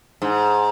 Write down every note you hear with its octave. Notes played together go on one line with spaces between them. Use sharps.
G#2